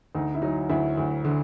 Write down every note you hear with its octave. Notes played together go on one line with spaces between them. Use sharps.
D2 D#4
E4
F#3 D#4
D2 E4
D2
D3